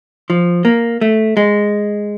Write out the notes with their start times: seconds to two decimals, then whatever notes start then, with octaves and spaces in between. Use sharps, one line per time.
0.30 F3
0.65 A#3
1.01 A3
1.37 G#3